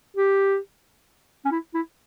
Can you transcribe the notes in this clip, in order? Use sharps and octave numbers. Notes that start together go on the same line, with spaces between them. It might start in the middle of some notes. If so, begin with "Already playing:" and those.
G4
C#4
E4
E4